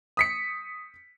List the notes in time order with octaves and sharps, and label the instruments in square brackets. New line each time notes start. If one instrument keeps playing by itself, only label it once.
[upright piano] D#6 B6 C#7